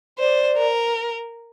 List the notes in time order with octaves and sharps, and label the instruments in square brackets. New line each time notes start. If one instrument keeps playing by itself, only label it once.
[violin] C5 [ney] D5
[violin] A#4